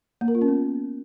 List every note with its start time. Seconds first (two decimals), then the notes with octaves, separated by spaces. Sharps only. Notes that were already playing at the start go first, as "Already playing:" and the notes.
0.21 A#3
0.28 A#4
0.35 F4
0.41 C#4
0.48 B3